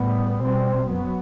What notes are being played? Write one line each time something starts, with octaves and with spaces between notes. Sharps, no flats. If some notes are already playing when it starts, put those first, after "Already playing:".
Already playing: A2 G3 B3
B2 G3 C4
F#2 F#3 B3